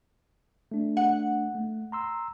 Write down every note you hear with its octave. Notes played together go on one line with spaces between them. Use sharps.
A3 D4
F#5
A3
A#5 C6 E6